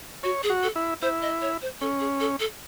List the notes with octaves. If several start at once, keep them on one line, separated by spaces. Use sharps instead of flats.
F#4 C#5
G#4
F#4
A4
E4
E4 C5
D#5
C#5
C5
C#4 A4
G#4
A4
A4